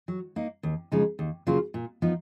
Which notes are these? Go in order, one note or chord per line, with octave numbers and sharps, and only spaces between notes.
F#3
A#3 D#4
D#2
C#3 F3 G#3 D#4
D#2
C#3 F#3 A#3 F4
A#2
F3 B3 D#4